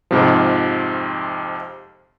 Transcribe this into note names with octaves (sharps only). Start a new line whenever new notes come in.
F2 G#2 C3 F3